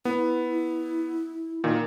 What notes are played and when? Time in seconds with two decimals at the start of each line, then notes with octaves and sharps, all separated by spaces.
0.05 B3 E4
1.64 A#2 D#3